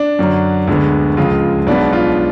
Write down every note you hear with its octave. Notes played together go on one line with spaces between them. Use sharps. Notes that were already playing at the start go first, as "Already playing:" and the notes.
Already playing: D4
F#2 D3 F#3
D2 D3 G#3 B3
C#2 C#3 F3 G#3 F4
B1 B2 G#3 B3 D4
F4